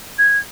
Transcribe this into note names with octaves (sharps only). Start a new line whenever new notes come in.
G#6